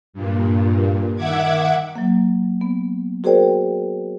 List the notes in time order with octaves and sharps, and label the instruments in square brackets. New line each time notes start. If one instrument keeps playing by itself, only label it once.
[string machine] G2 A#2
D#3 E5 F#5 D6 G#6
[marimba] F#3 A#3
B3
F#4 G#4 A#4 C5 D5 G5